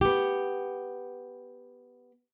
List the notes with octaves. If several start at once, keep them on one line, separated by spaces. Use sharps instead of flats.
B3 G4